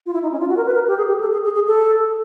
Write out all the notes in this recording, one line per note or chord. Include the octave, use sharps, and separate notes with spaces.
F4
E4
D#4
C#4
F4
F#4
A#4
B4
A#4
G4
G#4
G4
A4
G#4
G#4
G#4
A4